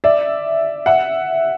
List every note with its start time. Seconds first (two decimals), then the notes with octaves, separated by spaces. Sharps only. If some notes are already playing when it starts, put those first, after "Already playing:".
0.04 D5 E5
0.86 E5 F#5